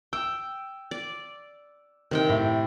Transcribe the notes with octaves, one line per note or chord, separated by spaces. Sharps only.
G5 E6
D5
C3 D#3 C4 G5
A2